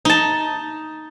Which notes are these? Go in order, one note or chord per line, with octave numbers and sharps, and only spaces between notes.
D#4 A5